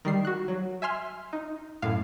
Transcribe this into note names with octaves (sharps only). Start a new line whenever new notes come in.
D#3 G3 C7
F#4 F#6
F#3
E5 G#5 C6 F6
D#4
F#2 A2 F5